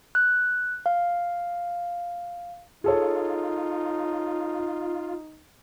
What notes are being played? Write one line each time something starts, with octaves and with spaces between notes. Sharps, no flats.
F#6
F5
D#4 F4 G#4 A4 C#5